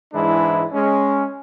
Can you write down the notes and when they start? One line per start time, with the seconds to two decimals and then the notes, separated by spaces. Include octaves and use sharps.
0.13 G#2 E3 G#3 D4 E4
0.73 G#3 C#4